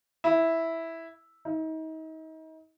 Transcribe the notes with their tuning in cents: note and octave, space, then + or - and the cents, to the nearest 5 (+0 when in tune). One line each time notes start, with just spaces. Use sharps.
E4 -5
D#4 +35